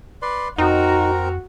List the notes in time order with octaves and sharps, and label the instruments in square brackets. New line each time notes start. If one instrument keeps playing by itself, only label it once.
[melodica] B4 D5 C6
[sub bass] F2 [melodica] C4 A#4 A#5 [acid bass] D#4 [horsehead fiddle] F#4